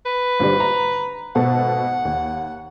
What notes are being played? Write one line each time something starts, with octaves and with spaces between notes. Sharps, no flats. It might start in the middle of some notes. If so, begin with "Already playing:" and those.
B4
G#1 D3 G3
A#5
G#1 B2 A4 F#5
D#2